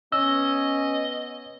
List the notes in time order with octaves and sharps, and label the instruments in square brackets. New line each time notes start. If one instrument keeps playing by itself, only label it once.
[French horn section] B3 [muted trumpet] C#4 [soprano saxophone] D#5 [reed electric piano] E6